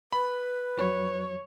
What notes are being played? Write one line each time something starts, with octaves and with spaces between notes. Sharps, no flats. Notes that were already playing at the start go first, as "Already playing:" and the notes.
B4 B5
F2 F#3 C#5